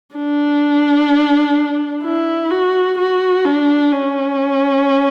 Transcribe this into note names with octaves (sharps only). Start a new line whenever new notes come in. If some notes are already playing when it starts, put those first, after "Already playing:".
D4
E4
F#4
F#4
D4
C#4